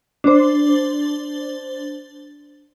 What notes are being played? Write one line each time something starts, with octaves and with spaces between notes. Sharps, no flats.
D4 C5